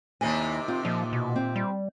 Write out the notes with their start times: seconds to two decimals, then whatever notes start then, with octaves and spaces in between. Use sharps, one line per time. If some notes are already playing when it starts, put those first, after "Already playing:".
0.21 D#2 C3 D#3 D4 E4 G#5
0.68 C4 F4
0.85 A#2 F3 D#5
1.13 B2
1.36 C4
1.56 G3